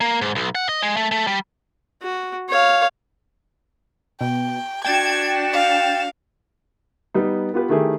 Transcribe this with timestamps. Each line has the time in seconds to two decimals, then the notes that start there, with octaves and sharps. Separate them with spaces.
0.01 A#3
0.21 G#2
0.35 B1
0.55 F#5
0.69 D#5
0.83 G#3
0.97 A3
1.11 A3
1.27 G3
2.02 F#4
2.49 C#5 F5
4.21 B2 G5
4.85 D4 F#4 G5 G#6 A6 E7
5.53 F5
7.14 G3 B3 D#4
7.54 B3 F4 G4 B4
7.69 D#3 A3 E4 G4 G#4